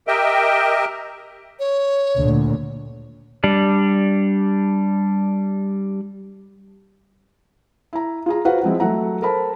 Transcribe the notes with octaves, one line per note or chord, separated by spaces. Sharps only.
G4 A#4 D#5 E5 G5
C#5
D2 A#2
G3 D4
E4 A#5
F4 G#4 A#5
F4 F#4 B4 C5 F5 F#5
F3 G#3 C4 E4
F#3 A3 F#5 A#5
A4 A#4 C5 A5 B5